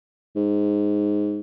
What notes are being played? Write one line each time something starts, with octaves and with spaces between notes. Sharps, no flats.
G#2